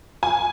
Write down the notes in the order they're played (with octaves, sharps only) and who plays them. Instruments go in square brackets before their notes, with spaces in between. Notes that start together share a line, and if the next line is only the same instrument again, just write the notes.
[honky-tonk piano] G#5